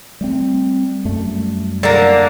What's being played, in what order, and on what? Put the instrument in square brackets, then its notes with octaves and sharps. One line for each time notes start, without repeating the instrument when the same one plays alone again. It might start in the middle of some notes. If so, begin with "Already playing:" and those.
[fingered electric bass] G3 A3 C4
F#2 G3 A3
[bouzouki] D3 A#3